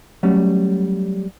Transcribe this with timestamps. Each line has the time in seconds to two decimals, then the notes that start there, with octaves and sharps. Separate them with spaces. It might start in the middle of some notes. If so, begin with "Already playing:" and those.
0.23 F#3 G3 A3 C#4